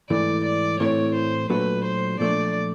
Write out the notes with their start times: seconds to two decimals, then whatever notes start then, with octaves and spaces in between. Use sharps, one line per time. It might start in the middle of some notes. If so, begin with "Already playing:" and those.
0.10 G#2 E3 A3 D5
0.44 D5
0.80 A2 E3 A3 C4 C#5
1.15 C5
1.50 A#2 F#3 A3 D4 F#4 B4
1.84 C5
2.20 A#2 F3 A3 D4 D5